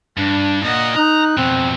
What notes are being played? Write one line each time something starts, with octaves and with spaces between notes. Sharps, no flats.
G2 D4
A#2 D#5 F#5
D#4 A#5 F#6
F2 B2 C4